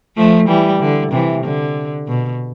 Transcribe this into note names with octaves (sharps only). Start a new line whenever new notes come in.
F3 A3
E3 G3
D3
C3 E3
D3
B2